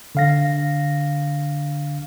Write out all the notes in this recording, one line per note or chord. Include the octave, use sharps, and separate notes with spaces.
D3 F5 A#6